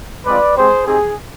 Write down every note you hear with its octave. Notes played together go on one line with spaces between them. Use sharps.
G#3 C4 F4 B4 D5
G#3 C4 G4 G#4 C5
C4 D#4 G4 G#4